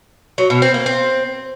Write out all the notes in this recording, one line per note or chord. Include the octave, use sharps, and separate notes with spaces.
F#3
B2
C4
A#3
C4